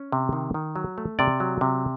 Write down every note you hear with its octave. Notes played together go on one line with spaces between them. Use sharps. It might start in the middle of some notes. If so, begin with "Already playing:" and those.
Already playing: C#4
C3
D#3
D#3
F#3
A3
C3 D5
F#3
C3